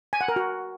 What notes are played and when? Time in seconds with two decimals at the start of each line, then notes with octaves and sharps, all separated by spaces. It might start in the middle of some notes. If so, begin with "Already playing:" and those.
0.13 G#5
0.21 F#5
0.28 A#4
0.36 F#4